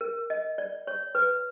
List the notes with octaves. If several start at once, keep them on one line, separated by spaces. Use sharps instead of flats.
A#4
D#5
D5
C#5
B4